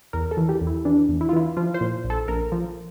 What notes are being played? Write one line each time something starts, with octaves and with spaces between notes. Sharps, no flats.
E2 A#4
A4
E3
G4
E2
E4
E3 D4
E2
E4
F4
E3 E4
F3 F4
C5
A#2
A#1
A4
A#1 A#4
F3